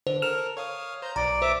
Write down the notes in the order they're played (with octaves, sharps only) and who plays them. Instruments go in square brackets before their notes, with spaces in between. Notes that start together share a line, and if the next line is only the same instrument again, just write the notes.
[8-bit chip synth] D3 [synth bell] C5
[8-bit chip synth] A4 A#4 [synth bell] F6 E7 F7
[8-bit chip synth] C#5 F5 D#6
[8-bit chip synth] C5 G6 [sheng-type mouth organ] A#5
[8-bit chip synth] B1 [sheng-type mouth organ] D5 [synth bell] A#5
[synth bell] C5 [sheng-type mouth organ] E5 D6